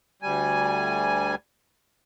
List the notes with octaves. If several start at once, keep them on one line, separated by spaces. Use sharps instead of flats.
D2 G3 G#5